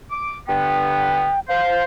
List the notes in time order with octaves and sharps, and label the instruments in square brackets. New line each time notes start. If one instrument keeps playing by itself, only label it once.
[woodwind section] D6
[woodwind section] G2 D3 B3 [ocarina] G5
[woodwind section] C5 [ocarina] F5